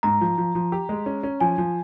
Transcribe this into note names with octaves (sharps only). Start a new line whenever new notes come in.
G#2 A#5
F3
F3
F3
G4
G#3
C#4
C#4
F3 G#5
F3